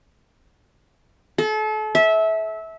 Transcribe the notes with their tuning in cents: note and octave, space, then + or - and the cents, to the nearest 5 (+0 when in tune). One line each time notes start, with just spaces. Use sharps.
A4 -35
E5 -20